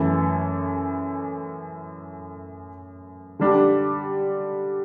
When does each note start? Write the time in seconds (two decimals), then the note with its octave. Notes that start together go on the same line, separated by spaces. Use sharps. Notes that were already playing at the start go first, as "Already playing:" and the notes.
Already playing: F#2 E3 A3 E4 A4
3.39 D3 G3 D4